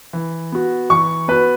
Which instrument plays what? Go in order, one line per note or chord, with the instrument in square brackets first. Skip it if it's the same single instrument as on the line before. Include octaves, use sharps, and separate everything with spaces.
[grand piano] E3
B3 F#4
[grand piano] E3 [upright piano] C#6
[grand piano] B3 F#4 [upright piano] B4